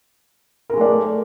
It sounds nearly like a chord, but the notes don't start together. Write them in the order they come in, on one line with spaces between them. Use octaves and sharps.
A#4 G#3 A3 D5 G#4